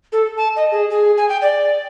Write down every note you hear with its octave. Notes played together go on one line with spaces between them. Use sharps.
A4
A5
D#5
G#4
G#4
G#5
G5
D5